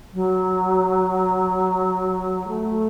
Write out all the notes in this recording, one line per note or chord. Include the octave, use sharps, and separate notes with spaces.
F#3
A3